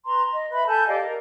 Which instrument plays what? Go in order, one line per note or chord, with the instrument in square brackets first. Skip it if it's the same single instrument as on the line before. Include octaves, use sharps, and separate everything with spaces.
[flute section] B4 A#5 C6
D#5
B4 E5 B5
A4 G#5 A5 G6
G4 D5 D#5 F5
A#4